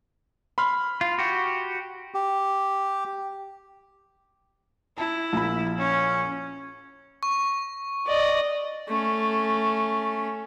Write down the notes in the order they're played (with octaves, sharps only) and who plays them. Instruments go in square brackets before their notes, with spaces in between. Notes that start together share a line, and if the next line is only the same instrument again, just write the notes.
[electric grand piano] B5 C6 F6
[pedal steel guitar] F4
F#4 G4
[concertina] G4
[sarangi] E4 [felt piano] A5
[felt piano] A#1 B5
[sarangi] C#4
[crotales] C#6
[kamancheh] D5 D#5
[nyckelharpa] A3 C#4